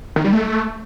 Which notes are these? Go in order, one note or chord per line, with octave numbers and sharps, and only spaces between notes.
D#3
G3
A3